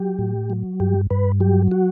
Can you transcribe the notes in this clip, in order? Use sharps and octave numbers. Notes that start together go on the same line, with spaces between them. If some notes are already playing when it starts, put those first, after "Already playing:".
Already playing: F#3 G4
A2
F#3
G2 G4
G2 B4
F#3 G4
F#4